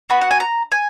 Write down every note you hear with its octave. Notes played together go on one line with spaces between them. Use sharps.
B3 F#4 B5
F#5
G#5
A#5
G#5